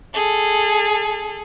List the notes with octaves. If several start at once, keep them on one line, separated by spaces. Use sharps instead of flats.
G#4 A4